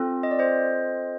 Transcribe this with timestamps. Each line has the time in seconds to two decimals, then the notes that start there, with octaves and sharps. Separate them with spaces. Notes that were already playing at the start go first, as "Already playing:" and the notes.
Already playing: C4 F4 A4
0.23 D#5
0.31 D5
0.39 C5 D#5